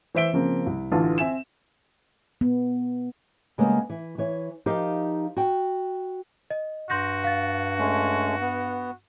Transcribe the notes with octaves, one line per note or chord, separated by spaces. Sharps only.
E3 C5 E5 D7 G7
C#3 F3 A#3 C4
C2
A1 D3 E3 F4 A5
C4 E5 G#5 E7
B3
C#3 G3 G#3 A#3 B3
E3
E3 C#5
F3 D#4 G4 A#4 D#5 F5
F#4 G5
D#5
G2 F#4 C6 G6 A#6
F5 A6
G#3 A3 C#4
B3